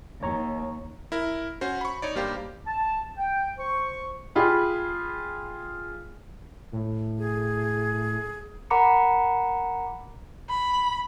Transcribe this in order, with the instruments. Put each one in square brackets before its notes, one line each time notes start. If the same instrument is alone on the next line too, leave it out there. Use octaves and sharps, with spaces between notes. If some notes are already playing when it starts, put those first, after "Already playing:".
[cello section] D#2 [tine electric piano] C#5 A#5 C#6
[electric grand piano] E4 A#4
C#4 F#4 C5
B5 C#6
D#4 C#5 D5
G2 G3 A#3 G4 C5 F5
[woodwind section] A5
G5
C5 C#6
[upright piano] F4 G4 G#4 B5
[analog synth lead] A2
[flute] G#4
[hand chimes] A#4 F#5 A#5 B5 D6 C#7
[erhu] B5